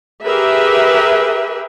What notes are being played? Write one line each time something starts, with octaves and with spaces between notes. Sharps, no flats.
G4 G#4 A#4 B4 E5